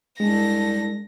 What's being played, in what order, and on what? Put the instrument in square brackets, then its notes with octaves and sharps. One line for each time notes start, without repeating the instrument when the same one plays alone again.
[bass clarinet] C2 [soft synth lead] G#3 [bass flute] D4 [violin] A#6